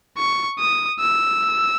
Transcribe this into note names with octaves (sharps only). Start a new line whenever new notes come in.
C#6
D#6
E6